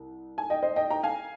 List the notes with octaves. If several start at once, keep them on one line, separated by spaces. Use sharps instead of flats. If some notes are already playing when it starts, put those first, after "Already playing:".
Already playing: C2
G#5
D#5 G5
C5 D#5
D#5 G5
G5 A#5
F5 G#5